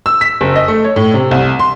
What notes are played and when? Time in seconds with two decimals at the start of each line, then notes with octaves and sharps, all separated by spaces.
0.06 E6
0.21 B6
0.41 F#1
0.56 D#5
0.68 A3
0.84 C#5
0.96 A2
1.14 C3
1.31 C2
1.59 C6